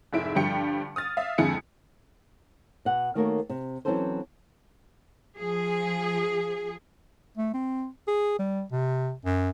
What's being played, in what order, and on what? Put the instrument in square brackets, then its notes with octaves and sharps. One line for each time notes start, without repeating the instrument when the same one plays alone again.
[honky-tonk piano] F1 G#2 E4 E5 D7
G2 D3 F3 G3 G5 C#7
D#6 F6 A6
E5 F5
F2 D3 G#3 E4 G#5 C#7
[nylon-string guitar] B2 F#5
D#3 A3 A#3 F#4 A#4 C#5
C3
E3 F#3 C4 C#4 A4 C5
[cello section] F3 G#4
[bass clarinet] A3
C4
G#4
G3
C3
F#2